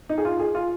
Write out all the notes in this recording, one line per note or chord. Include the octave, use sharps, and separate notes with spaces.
D#4
G#4
F4
G#4
F4